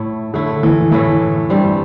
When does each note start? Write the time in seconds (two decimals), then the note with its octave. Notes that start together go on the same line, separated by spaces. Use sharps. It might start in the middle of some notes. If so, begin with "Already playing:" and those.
Already playing: A2 A3 E4
0.34 A2 D3 A3 E4
0.63 E3
0.91 A2 E3 A3 E4
1.50 G2 G3 C4